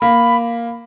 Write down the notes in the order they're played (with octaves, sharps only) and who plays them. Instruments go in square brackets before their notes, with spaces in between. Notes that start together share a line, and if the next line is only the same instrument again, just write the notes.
[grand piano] A#3 [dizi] B5